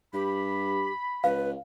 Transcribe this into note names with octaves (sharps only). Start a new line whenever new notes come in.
G2 G4 B5
C#2 B4 F5